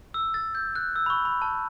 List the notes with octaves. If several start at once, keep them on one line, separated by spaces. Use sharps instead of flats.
E6
A6
G6
F#6
E6
B5
C#6
B5
A5